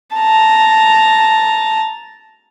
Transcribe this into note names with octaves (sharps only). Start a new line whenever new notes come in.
A5 A#5